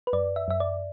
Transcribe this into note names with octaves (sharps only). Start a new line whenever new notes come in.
B4
F#2 D5
E5
F#2 E5
D5